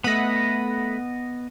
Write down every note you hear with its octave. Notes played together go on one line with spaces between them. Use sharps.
A3 B3 D#5 F#5 B5